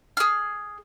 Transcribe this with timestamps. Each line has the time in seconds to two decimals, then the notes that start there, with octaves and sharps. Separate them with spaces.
0.17 G#4 F6